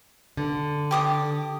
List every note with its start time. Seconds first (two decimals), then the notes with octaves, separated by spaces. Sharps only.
0.37 D3
0.91 G4 D6 D#6